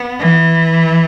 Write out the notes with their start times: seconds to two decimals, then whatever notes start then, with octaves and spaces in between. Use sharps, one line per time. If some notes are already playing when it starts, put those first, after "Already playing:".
Already playing: B3
0.20 E3